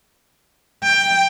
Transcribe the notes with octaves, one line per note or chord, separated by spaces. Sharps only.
G5